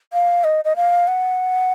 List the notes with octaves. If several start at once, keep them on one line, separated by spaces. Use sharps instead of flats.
F5
D#5
D#5
F5
F#5